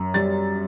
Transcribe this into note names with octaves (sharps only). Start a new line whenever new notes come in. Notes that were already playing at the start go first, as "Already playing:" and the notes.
Already playing: F#2
G3 A6